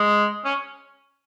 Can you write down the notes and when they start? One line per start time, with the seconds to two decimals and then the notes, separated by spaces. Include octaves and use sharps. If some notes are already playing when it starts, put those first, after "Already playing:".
Already playing: G#3
0.45 C#4